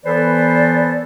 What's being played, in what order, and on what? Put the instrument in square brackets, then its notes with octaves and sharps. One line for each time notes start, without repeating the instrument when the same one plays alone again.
[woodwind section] E3 B3 A4 B4 C5 D5